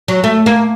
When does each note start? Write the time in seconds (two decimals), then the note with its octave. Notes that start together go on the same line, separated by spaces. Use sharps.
0.08 F#3
0.24 A3
0.46 A#3